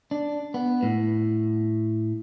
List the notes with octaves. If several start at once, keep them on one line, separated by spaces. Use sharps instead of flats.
D4
B3
A2